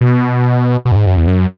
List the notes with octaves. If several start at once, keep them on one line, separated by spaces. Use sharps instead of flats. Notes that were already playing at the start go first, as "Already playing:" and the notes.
B2
B2
F#2
G#2
F#2
E2
F#2